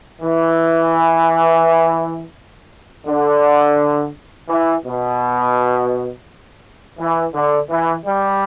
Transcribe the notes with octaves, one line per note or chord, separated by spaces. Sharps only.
E3
D3
E3
B2
E3
D3
E3
G3